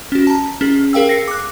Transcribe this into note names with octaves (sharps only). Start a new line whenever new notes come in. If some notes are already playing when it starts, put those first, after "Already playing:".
C#4 F#4
A5 A#5
C#4 G#4
G#4 A#4 F5 G5 E6
A#6 C7 C#7
D6 F#6